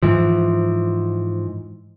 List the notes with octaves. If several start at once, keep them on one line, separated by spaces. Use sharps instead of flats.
G#2 E3 F3